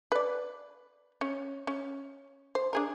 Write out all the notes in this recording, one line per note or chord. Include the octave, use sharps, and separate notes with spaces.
B4 D5
C#4
C#4
C5
D4 G#4 A#4